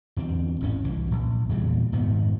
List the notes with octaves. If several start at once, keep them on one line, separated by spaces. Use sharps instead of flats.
E2 D3 C4
G#1 A2 C#4
C2 E3
A#1
E2 A#2 C#3 G3
F1 G#2 D#3 B3